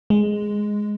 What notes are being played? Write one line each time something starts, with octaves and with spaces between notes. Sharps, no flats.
G#3